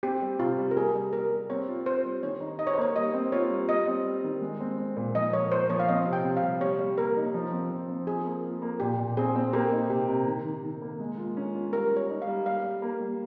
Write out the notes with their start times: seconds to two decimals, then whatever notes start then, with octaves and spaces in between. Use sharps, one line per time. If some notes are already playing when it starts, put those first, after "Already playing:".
0.03 C4 G4
0.22 G3
0.40 C3 F4
0.58 G3
0.71 A#4
0.77 G3 G#4
0.95 G3
1.13 G3 A#4
1.32 G3
1.50 C4 C#5
1.68 F4
1.86 C4 C5
2.05 G3
2.23 D#3 C#5
2.41 D#4
2.59 D#4 D#5
2.67 C#5
2.73 C5
2.77 A#3 C#5
2.96 G3 D#5
3.14 C4
3.32 F4 C#5
3.51 G3
3.69 G3 D#5
3.87 C4
4.05 G3
4.24 D#3
4.41 G#3
4.60 C4
4.78 C4
4.96 A#2
5.15 F3 D#5
5.33 A#3 C#5
5.51 A#3 C5
5.70 F3 C#5
5.80 F5
5.88 C4 D#5
6.06 C3
6.13 G5
6.25 C3
6.37 F5
6.43 G3
6.61 G3 C#5
6.79 G3
6.97 A#3 A#4
7.17 D#4
7.34 F3
7.52 C4
7.71 F3
7.89 C4
8.07 F4 G#4
8.25 A#3
8.44 F4
8.62 A#3
8.80 A#2 G4
8.99 A#2
9.17 C4 G#4
9.35 C4
9.53 A#3 G4
9.72 D#4
9.89 C3 G4
10.08 C3
10.26 D#3
10.45 D#3
10.63 D#3
10.82 A#3
10.99 G#3
11.18 F4
11.37 C#4
11.55 F4
11.73 G3 A#4
11.92 G3 C#5
12.10 D#4
12.22 F5
12.27 G3
12.45 G3 F5
12.64 G3
12.82 A#3
13.00 G3